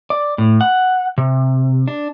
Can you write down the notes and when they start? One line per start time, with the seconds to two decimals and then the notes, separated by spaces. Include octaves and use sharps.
0.10 D5
0.38 A2
0.61 F#5
1.18 C3
1.88 D4